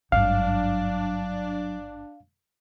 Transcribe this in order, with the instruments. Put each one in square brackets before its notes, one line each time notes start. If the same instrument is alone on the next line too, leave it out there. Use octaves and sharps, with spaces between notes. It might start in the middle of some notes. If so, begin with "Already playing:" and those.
[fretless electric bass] G#1 G2 [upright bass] F#3 [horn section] D4 [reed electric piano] F5